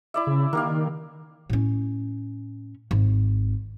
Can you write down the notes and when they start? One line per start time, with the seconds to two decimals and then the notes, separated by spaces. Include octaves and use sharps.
0.14 E4 D5 E5
0.27 C#3
0.53 D#3 A#3 G4 F5
1.50 A2 C#4
2.91 G#1